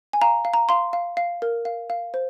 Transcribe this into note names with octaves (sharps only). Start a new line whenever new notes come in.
G#5
F5 A#5
F5
A#5
F5 C6
F5
F5
A#4
F5
F5
C5